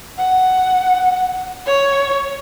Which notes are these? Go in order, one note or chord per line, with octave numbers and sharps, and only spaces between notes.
F#5
C#5